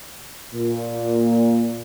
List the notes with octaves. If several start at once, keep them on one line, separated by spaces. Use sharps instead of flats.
A#2